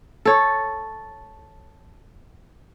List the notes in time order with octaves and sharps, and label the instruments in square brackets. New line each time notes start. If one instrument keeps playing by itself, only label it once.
[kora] A4 C#5